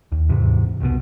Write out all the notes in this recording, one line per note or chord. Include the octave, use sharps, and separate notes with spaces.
D#2
D#2 G#2 C3 E3
F1 C2 B2